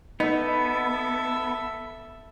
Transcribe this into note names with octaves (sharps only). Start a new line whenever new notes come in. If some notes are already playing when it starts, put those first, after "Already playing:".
B3 D#4 A4 E5